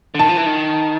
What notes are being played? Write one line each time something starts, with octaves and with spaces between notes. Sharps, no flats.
D3
D#3 A5
F3
E3
D#3